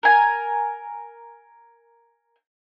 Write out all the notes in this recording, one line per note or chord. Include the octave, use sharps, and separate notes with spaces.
A#4 G#5